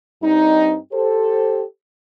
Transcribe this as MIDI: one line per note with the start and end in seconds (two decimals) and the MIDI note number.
0.22 0.76 43
0.22 0.76 55
0.22 0.76 60
0.22 0.76 63
0.92 1.63 67
0.92 1.63 69
0.92 1.63 72